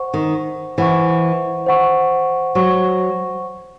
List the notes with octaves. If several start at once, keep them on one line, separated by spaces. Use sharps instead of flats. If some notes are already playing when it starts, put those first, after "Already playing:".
Already playing: C5 F#5 C#6
D#3
E3 C5 F#5 C#6
C5 F#5 C#6
F#3 C5 F#5 C#6